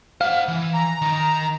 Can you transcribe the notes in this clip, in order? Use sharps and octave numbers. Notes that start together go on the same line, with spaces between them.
C5 F5 F#5
E3
A#5
D#3